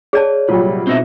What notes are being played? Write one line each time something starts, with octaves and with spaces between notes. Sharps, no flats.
G#4 C#5 D5 A5
C2 A#2 F#3 G3 F4
B2 C4 D#4 E5